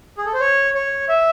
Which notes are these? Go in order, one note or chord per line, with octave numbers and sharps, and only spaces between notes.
G#4
A4
C5
C#5
C#5
E5